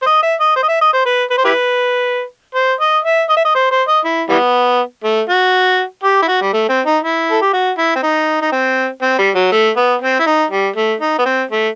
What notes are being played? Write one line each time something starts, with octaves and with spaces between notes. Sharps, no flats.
C5
D#5
E5
D#5
C5
D#5
E5
D#5
C5
B4
B4
C5
E4 G4 B4
C5
D#5
E5
D#5
E5
D#5
C5
C5
D#5
E4
E3 G3 B3
A3
F#4
G4
E4
F#4
G3
A3
C4
D#4
E4
A4
G4
F#4
E4
C4
D#4
D#4
C4
C4
G3
F#3
A3
B3
C4
E4
D#4
G3
A3
D#4
B3
C4
A3